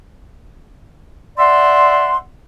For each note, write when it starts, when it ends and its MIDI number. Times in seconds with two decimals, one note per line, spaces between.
1.38 2.17 74
1.38 2.17 76
1.38 2.17 78
1.38 2.17 84